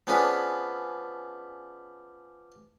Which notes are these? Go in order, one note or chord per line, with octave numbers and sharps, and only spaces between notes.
F3 B3 C#4 D4 G#4 B4